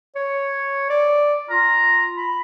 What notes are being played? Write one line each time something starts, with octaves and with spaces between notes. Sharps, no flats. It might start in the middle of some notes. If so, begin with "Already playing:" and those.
C#5
D5
F4 A#5
B5